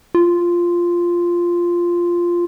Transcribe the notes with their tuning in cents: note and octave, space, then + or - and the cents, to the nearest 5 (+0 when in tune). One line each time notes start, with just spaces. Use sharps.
F4 -5